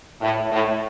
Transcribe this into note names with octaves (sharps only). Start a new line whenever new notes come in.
A2
A2